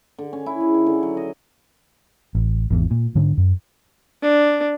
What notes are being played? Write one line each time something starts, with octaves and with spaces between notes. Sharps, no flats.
D3
C#4
E4
G#4
D#3
D3
F#3
D#5
A1
G#1 E2
A#2
G#2 D3 D4
F#2
D4